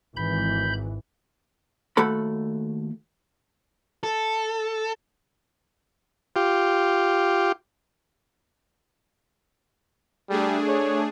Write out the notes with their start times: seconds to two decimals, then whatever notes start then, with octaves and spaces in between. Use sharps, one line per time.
0.17 G#1 E3 B5 G6
1.97 D#2 A3 F#4 A4 B5
4.03 A4
6.36 F4 G4
10.30 G3 A3 D4 G#4
10.68 C#5